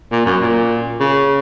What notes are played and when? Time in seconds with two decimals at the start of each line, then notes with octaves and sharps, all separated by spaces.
0.12 A#2
0.26 F#2
0.41 A#2
1.00 C#3